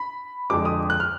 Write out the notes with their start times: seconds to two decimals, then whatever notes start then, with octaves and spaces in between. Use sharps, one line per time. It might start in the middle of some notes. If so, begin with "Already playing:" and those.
Already playing: B5
0.50 F2 D3 G#3 D6
0.65 D#6
0.90 F#6
1.00 F6